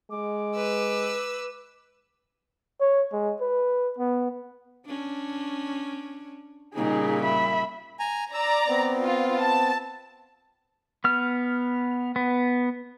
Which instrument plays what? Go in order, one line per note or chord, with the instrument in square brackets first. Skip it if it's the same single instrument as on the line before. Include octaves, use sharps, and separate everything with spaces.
[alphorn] G#3 [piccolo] D6
[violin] B4 E6
[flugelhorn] C#5
G#3
B4
B3
[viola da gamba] C#4 D4
[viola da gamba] A#2 C#3 G3 [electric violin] D#4 G#4
[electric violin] E5 B5
[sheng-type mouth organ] G#5 A#5
[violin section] D5 A#5 [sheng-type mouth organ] E6
[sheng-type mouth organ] B3 C4
[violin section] F4
A5
[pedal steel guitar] B3 F6
B3